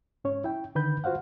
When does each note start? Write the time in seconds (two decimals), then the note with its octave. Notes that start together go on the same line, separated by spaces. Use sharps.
0.24 G#2 C#4 C#5
0.44 E4 G5
0.75 D3 D#3 B4 B5 G6
1.04 F4 F#4 C5 F5 F#5